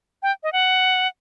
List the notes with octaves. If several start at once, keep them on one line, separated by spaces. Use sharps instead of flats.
G5
D#5
F#5